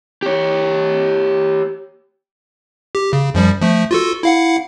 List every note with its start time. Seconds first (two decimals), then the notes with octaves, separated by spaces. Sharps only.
0.23 G4 C#5
2.95 G4
3.13 C#3
3.34 F#2 F3 G3
3.61 F3 A3
3.91 F4 F#4 A4
4.23 E4 F5 F#5